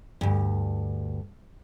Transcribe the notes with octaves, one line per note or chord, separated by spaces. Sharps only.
D2 G2